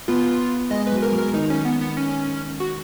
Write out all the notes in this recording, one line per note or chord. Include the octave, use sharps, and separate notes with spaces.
B3 F4
G#3 D#5
B4
F#3
A#4
F#3
A#4
D#3 D#4
C#4
B3
B3
C#4
F#4